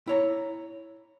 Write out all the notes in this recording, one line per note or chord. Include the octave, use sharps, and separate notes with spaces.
E4 C#5 A#5